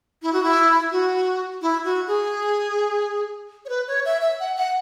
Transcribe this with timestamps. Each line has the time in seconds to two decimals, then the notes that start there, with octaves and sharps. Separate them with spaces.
0.23 E4
0.33 F#4
0.43 E4
0.91 F#4
1.62 E4
1.84 F#4
2.07 G#4
3.65 C#5
3.69 B4
3.88 C#5
4.05 E5
4.22 E5
4.40 F#5
4.57 F#5